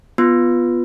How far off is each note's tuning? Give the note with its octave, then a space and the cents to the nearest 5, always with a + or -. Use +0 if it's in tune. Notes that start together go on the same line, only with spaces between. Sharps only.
B3 +0 F4 +0 B4 +0